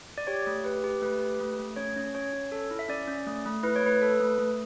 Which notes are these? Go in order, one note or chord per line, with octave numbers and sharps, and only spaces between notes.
D5
G4 C#5
A3
G4 B4
G4
A3 B4
G4
A3
A3
C#4 C#5
C#4
C#4 C#5
C#4
A4
E4
E5
C#4 D5
C#4
A3
A3
E4 B4
C#5
A3 B4
A4
A3
A3